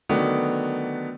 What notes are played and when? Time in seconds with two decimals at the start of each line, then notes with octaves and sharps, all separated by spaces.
0.09 D3 D#3 F#3 A3 B3 D4